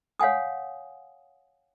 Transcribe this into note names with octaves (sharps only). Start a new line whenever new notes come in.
C#5 F5 F#5 G#5 D#6